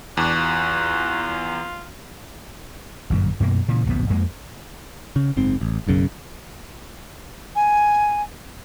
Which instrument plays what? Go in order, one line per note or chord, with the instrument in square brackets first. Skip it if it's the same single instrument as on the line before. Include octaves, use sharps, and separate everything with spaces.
[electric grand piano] E2 [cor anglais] D4 [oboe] F#4
[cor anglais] F4
[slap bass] G1 F#2 A#2
F#2 B2 A#3
A#2 C#3 E3
D1 A#1 F#2 B3
F2 G#3 A#3
[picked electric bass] C#3
F#1 G#2 C4
A1
F#1 B1 F#2 C#3
[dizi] G#5